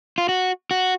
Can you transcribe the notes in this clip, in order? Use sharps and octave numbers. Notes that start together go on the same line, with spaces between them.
F4
F#4
F#4